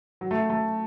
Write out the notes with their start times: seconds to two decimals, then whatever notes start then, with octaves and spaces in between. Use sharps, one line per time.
0.21 F#3
0.31 A3
0.50 A3